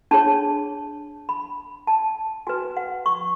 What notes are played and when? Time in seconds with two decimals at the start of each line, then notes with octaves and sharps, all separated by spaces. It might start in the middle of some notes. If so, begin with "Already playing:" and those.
0.11 D4 G#4 C#5 A5
1.29 B5
1.87 A5
2.47 F#4 B4 G#5
2.77 F#5
3.06 C#6